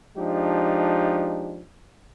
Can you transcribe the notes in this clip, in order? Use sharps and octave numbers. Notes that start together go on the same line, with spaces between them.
F3 G#3 D4 D#4 G4